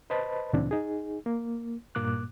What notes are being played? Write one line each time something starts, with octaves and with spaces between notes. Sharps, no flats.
B4 C5 D#5 A5 B5
D2 A#2 C#3 E3 C4 D4
D#4 G#4
A#3
G2 A#2 A#3 D6 F#6